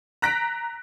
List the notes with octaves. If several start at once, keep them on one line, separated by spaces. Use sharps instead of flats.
A#5 F#6 A#6 B6 D7